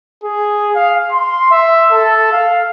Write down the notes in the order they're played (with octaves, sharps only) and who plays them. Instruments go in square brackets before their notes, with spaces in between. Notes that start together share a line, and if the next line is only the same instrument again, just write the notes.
[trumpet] G#4
F5
C6
E5
A4
F5